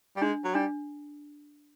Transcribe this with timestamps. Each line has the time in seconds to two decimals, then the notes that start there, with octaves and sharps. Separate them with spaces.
0.16 G3
0.22 G#3 D4
0.44 F#3
0.55 G3 D4